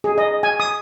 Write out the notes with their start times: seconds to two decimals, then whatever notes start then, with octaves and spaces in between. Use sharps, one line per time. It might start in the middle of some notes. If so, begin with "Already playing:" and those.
0.04 G#4
0.18 D#5
0.43 G#5
0.60 D#6